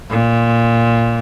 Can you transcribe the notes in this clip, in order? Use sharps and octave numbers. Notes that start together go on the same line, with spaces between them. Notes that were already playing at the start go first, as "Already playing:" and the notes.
A#2